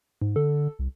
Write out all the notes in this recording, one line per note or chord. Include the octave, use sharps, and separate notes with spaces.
G#2
D3 A4
C2